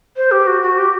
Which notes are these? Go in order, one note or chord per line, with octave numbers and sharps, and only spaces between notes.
C5
G4
F#4
F#4
G4